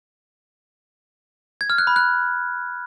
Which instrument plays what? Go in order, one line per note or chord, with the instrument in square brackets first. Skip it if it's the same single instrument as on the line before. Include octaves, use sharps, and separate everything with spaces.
[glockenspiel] G#6
F6
F#6
B5
F#6